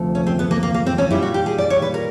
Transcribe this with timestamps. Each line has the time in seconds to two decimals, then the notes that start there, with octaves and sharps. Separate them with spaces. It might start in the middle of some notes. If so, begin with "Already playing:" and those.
Already playing: D2 C3 F3 A3
0.15 C#4
0.27 C4
0.39 B3
0.51 A#3
0.63 A#3
0.74 A#3
0.86 C4
0.98 C#4
1.10 A#2 G3 E4
1.22 F#4
1.34 G4
1.46 G#4
1.58 D5
1.70 C#5
1.82 B4
1.94 A#4